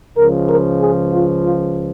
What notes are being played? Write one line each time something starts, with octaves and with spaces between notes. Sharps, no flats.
C#2 C#3 F3 A#4
A#4
G#4
F4
F4